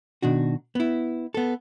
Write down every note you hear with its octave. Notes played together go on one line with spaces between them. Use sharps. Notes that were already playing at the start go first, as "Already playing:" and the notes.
B2 D#3 D4 F#4
B3 E4
B3 A4